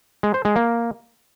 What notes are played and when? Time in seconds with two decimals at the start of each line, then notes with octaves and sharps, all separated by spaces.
0.23 G#3
0.34 C5
0.45 G#3
0.56 A#3